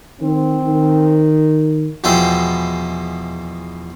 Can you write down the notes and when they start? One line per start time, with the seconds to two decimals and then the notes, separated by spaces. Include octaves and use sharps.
0.21 D#3 C4
0.63 D#3
2.04 E2 B2 F3 G#3 E4 G5